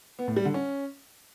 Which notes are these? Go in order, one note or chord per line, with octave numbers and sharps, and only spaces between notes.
B3
A2
G3
D3
C#4